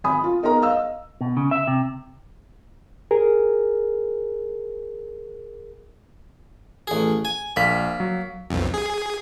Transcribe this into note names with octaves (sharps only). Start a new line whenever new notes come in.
G#1 G#5 B5 D#6
F4
B3 D#4 G#4 A#4 A#5
D#5 F5 E6
B2
C#3
E5
C3
G#4 A#4
A1 G#4
G#5
A#1 A#3 B6
F#3
B1 F2
G#4